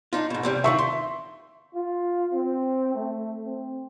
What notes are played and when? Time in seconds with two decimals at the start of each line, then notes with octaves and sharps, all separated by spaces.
0.13 D4 D#4 F4
0.30 G#2 B2
0.43 E2 C3 G3
0.64 D#3 E3 F4 E5 C#6
0.79 C6
1.75 F4
2.33 C4
2.94 A3
3.44 C4